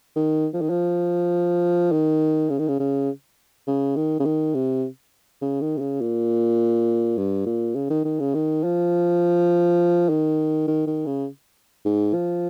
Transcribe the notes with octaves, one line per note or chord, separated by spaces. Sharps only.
D#3
F3
D#3
F3
D#3
C#3
D#3
C#3
C#3
C#3
D#3
C#3
D#3
C3
C#3
D#3
C3
C#3
A#2
G2
A#2
C#3
D#3
D#3
C#3
D#3
F3
D#3
D#3
D#3
C#3
G#2
F3